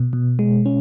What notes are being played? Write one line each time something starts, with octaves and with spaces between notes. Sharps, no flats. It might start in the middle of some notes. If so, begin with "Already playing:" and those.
Already playing: B2
B2
G#3
C#4